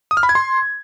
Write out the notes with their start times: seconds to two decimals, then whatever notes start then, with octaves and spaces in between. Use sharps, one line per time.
0.11 D#6
0.17 F6
0.23 B5
0.29 G#6
0.35 C6